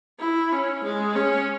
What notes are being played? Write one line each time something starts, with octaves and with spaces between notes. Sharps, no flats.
E4
C#4
G#3
C#4